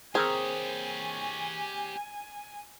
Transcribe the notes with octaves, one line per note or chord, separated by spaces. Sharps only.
C4 G4 G#4 A#4 C#5 G#5